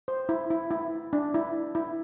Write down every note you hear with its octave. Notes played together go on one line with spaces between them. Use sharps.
C5
E4
E4
E4
D4
E4
E4